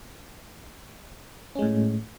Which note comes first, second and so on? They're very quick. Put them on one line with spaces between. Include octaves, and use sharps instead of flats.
C#4 G#3 A2